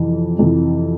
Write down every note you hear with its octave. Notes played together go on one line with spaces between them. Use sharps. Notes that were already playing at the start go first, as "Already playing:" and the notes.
Already playing: F2 C3 E3
F2 C3 E3